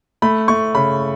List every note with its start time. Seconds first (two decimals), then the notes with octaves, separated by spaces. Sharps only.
0.22 A3 B5
0.48 A3 C#6
0.74 C#3 B5